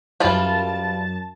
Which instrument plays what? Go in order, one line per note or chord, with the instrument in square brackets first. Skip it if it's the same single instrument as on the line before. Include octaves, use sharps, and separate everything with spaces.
[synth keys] F#2 A5 A6 [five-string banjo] E3 G3 F4